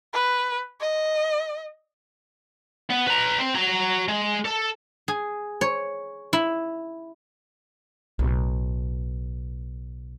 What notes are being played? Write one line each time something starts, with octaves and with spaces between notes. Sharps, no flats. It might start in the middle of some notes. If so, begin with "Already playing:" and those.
B4
D#5
B3
B4 A#5
C4
F#4 A#5
G#3
A4
G#4
C#5
E4
B1 A2